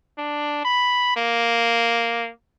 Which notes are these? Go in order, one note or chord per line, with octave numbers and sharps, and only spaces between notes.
D4
B5
A#3